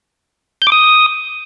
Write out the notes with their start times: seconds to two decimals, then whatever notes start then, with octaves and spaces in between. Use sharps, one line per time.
0.62 G6
0.67 D6
0.72 D#6